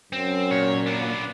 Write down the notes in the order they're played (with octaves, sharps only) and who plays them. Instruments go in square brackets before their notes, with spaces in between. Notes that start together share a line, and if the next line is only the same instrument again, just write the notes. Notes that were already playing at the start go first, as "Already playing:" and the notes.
[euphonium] F#2 [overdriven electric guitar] C4
[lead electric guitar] A#2 [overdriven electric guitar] C#5
[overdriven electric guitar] B3 D4